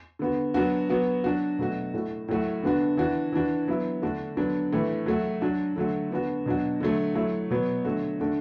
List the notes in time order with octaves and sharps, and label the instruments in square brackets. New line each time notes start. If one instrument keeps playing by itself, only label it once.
[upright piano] D3 B3 F#4
F#3 B3 D4 F#4
F#3 B3 F#4
F#3 D4 F#4
B2 F#3 A3 F#4
A2 A3 F#4
A2 F#3 A3 F#4
D3 B3 D4 F#4
E3 D4 F#4
E3 D4 F#4
F#3 B3 E4
D3 A3 D4 F#4
D3 F#3 B3 D4
A2 E3 A3
F#3 A3 F#4
F#3 D4 F#4
D3 F#3 A3 F#4
D3 B3 D4 F#4
B2 F#3 D4 F#4
D3 F#3 A3
F#3 A3 E4
B2 F#3 B3
D3 F#3 A3 F#4
D3 A3 D4 F#4